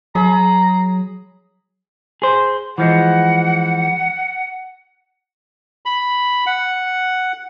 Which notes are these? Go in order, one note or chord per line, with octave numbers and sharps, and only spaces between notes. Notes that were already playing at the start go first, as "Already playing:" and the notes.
F#3 G#4 A#5 B5
G#4 C5
E3 F3 G#3 F#5
B5
F#5